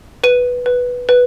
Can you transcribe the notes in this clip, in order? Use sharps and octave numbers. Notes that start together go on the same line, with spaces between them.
B4 D#7
B4
B4